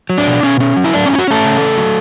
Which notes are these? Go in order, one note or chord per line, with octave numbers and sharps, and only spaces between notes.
F#3
D4
B2
B2 C#4
C#4
F#3
E4
A3 D4
F#3 C#4
E4
F#3 F#4
A3 C#4 A4
C#3
A3
F#3